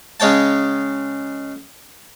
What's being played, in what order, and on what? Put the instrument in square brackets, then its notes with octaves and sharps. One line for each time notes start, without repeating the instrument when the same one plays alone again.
[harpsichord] C#3 G#3 C#5 G5 A5